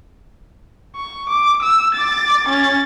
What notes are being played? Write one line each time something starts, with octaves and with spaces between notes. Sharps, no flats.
C#6
D6
E6
D6 A6
C#4 A6